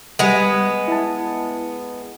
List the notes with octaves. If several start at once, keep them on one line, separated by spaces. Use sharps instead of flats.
G3 G#3 B3 F#5
E4 A5